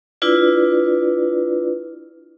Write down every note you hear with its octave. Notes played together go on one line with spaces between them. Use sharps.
D4 E4 F4 B4 D5